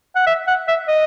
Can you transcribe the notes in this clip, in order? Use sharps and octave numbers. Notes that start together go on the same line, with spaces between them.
F#5
E5
F#5
E5
D#5